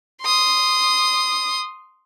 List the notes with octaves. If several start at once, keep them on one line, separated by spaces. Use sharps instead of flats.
C6 D#6